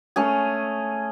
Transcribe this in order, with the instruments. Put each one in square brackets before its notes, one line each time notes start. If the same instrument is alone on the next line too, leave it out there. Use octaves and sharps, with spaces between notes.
[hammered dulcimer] A3 C#4 G#4